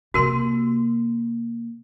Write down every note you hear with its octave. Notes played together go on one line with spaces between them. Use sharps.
C3 A#3 F#4 A#4 C6